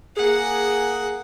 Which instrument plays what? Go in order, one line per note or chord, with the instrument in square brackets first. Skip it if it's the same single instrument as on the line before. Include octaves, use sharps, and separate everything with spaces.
[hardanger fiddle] A#3 F#5 [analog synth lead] G#4